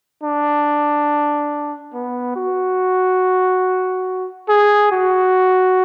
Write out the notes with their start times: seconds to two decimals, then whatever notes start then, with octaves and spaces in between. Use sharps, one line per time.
0.23 D4
1.94 B3
2.36 F#4
4.49 G#4
4.92 F#4